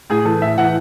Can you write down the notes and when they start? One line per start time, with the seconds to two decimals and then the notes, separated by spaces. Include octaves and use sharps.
0.10 A2 G#4
0.25 E3 A4
0.42 A2 E5
0.58 E3 F#5